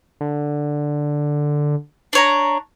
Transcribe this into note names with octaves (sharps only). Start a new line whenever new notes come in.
D3
D4 C#5 A#5